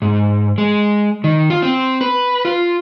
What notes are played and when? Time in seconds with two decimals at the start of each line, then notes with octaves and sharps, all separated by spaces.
0.02 G#2
0.58 G#3
1.24 D#3
1.50 F4
1.62 C4
2.01 B4
2.45 F4